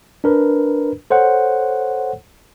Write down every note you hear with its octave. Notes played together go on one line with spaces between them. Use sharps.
D4 A#4 B4
A4 C5 C#5 F#5